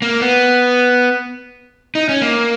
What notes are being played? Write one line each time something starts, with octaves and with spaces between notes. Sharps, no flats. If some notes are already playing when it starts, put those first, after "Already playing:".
A#3
B3
D#4
C#4
A#3